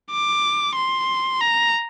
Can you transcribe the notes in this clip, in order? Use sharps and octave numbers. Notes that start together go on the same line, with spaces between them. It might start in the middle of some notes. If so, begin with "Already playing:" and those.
D6
C6
A#5